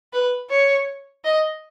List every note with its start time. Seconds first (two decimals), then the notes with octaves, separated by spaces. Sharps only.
0.13 B4
0.50 C#5
1.25 D#5